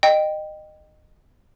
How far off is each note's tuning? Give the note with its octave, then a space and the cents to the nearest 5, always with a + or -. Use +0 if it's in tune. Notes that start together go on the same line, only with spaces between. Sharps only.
D#5 -20 G5 +0